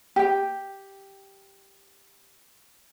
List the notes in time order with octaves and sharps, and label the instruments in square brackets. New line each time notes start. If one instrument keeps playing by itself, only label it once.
[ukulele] G4 G5